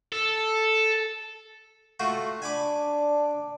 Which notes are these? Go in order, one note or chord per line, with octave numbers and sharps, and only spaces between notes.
A4
A3 F4 F#4
D4 G#5 B5 D6